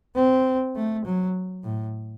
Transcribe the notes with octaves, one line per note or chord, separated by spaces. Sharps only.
C4
A3
F#3
A2